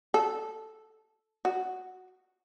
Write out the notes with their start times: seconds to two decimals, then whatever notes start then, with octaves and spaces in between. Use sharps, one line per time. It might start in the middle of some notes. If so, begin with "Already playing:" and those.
0.14 A4
1.45 F#4